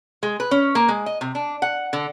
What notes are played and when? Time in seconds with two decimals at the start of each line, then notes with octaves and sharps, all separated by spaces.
0.23 G#3
0.40 B4
0.51 C#4
0.75 A#3
0.88 G#3
1.06 D#5
1.21 C3
1.35 D4
1.62 F#5
1.93 D3